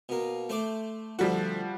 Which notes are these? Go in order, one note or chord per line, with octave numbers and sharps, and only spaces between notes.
B2 A#3
A3 C5 D6
D2 F3 G3 F#4 A4